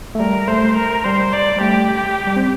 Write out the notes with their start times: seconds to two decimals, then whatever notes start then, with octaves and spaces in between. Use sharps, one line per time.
0.15 A3
0.20 G3 A#4
0.47 A3 C5
0.77 A#4
1.04 G3 C5
1.32 D5
1.56 G3
1.61 A3 G4
2.27 G3
2.36 C4